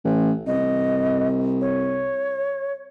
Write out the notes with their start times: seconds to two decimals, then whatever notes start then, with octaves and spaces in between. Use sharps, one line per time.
0.05 A1
0.47 C2 D#5
1.61 C#5